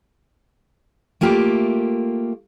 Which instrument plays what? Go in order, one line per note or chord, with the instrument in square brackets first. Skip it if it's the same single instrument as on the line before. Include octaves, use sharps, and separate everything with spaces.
[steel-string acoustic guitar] A3 A#3 F4 G4